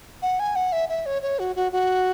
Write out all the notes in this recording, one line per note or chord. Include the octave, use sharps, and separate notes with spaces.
F#5
G#5
F#5
E5
E5
C#5
C#5
F#4
F#4
F#4